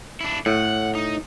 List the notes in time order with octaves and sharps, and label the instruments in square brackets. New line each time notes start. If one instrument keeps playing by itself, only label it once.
[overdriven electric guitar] D4 E4
[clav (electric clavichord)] A2 [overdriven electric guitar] F#5
[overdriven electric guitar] D#4